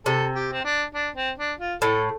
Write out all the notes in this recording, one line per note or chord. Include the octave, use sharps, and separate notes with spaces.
C3 A4
G4
C4
D4
D4
C4
D4
F4
A2 A4